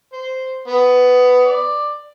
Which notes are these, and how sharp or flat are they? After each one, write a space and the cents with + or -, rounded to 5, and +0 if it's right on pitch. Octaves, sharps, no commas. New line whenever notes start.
C5 -5
B3 +15
D5 +10